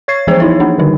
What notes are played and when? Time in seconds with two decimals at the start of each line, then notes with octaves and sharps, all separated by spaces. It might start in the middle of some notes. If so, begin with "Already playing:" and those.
0.08 C#5 C#6 G#6 C7
0.27 E3 F3 B3 G#4 C5
0.40 D#4 E4 C#5
0.60 A#3 D4 D#4
0.78 D3 D#3 G3 D#4